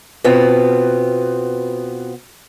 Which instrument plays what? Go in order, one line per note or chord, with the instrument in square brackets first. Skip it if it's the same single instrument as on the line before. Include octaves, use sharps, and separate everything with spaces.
[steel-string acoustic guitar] B2 B3 C4 F4